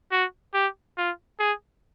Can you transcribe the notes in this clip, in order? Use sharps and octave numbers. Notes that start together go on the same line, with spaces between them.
F#4
G4
F4
G#4